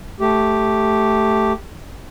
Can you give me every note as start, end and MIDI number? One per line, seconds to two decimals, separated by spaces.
0.20 1.53 57
0.20 1.53 67